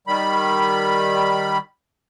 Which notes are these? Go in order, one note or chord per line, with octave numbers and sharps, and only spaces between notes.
D#3 G3 B5